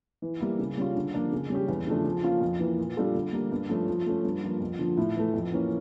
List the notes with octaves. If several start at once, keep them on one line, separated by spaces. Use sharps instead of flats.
E3
G3 A#3 E4
C#3
G3 C#4 F4
D3
F3 A#3 D4
C#3
G3 C#4 G4
E2
C#3 F3 A3 D4
F3
A#3 C#4 F4
F2
E3 A#3
A#2
G3 D4 F4 A4
D3
G3 A#3
G2
F3 A3 C#4
F3
A3 C#4
G2
F3 A#3
F2
D3 F3 A#3
A2
E3 A3
F2
E3 A#3 C#4